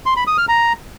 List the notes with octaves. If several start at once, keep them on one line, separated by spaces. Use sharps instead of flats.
C6
B5
D#6
F6
A#5